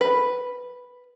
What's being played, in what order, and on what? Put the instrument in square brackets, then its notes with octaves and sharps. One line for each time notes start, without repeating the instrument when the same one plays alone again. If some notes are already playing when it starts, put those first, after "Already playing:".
[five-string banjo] B4